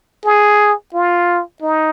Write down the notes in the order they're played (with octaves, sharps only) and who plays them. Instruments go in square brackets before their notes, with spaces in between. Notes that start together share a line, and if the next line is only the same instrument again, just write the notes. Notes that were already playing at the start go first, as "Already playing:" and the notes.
[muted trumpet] G#4
F4
D#4